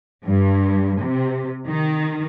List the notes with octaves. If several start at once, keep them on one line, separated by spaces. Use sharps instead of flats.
G2
C3
D#3